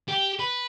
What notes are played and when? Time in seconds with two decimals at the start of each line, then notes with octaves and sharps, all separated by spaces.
0.09 G4
0.39 B4